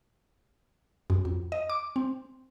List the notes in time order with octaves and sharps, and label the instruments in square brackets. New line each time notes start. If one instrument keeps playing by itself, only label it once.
[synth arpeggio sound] F#2
F2
D#5
D6
C4